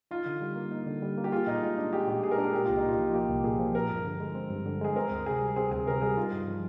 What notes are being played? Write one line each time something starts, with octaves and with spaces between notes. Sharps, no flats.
D#4 F4
D3
G3
A#3
D#4
D3
G3
A#3
G4
F4 G#4
A#2 D#4
G#3 F4
D4
G4 G#4
A#2 G4
G#3 G#4
A#4
D4 G#4
A#3 G4
C2 F4
D#4
A#2 F4
F3
F4
A#3 G4
C2
A#2 G#4
F3
C4 A#4
G2
D3
G#3
C4
G2
D3
G#3 G#4
C4 A#4
D2
C3 G#4
G3
C4 G#4
D2 G#4
C3 A#4
G3 G#4
D#4 F4
G2
F3